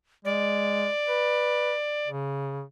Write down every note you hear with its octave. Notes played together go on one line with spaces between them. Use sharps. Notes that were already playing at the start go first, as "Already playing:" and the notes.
G#3 D5
B4
C#3